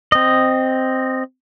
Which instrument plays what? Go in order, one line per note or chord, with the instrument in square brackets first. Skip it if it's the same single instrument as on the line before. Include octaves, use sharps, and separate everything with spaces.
[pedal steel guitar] C4 D#5